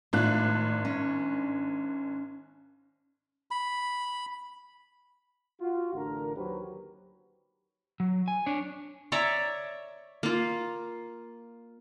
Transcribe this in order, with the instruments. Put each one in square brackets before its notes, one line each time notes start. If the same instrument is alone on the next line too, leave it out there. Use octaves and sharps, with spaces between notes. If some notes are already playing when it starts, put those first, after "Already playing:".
[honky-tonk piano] G#1 D4 F#6 [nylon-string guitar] A2 F4 F5
[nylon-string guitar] C#4
[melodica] B5
[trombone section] F4 F#4
A1 D3 D4 A#4
D#2 F#3 G4 B4 C5
[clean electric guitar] F#3
G#5
D4 C#5
[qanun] C#5 D5 E5 A#5
A#3 F4